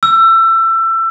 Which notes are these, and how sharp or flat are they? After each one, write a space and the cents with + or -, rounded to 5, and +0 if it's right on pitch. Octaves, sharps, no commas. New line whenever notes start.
E6 +25